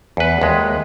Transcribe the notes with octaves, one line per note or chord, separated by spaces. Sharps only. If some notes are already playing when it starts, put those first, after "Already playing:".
E2 B4
D#2 G#3